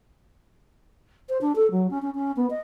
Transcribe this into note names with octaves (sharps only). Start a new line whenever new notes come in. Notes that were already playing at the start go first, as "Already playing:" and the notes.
C5
D4
A4
F#3
C#4
C#4
C#4
B3
D#5